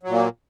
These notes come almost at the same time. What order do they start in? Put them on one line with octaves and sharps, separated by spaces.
F#3 A#2 A#3